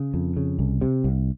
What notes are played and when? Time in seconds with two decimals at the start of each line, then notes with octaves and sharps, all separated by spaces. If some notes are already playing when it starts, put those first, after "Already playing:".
Already playing: C#3
0.14 F2
0.37 C#3
0.59 C2
0.81 C3
1.04 C2